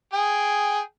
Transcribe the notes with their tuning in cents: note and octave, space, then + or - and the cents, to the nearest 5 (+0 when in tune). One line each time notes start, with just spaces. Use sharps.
G#4 +0 G5 +0